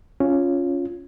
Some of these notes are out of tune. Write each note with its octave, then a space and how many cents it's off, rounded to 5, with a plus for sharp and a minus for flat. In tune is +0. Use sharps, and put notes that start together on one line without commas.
C#4 +0 F4 +0